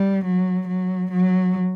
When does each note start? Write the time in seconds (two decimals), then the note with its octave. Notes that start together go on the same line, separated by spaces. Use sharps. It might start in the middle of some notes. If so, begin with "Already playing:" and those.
Already playing: G3
0.24 F#3
0.67 F#3
1.11 F#3